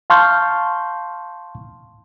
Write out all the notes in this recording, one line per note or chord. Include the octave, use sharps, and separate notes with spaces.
F5 A5 C6 C#6 F6 G6